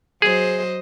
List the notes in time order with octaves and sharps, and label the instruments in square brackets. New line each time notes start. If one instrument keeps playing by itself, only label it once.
[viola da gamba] F#3 C5 D#5 [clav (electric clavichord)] G#4